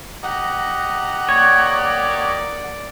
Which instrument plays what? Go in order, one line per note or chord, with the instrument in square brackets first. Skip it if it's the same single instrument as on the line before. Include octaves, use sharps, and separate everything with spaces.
[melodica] G4 D#5 A#5 [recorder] F#5
[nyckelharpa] A#3 D5 [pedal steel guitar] C#5